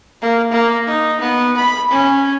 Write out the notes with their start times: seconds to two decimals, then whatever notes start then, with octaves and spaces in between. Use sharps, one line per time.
0.22 A#3
0.52 A#3
0.87 D#4
1.20 B3
1.57 B5
1.91 C#4